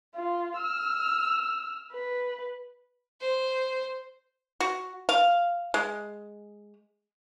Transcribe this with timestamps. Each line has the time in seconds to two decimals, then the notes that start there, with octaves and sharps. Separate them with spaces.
0.16 F4
0.57 E6 F6
1.93 B4
3.20 C5
4.60 F#4
5.09 F5
5.74 G#3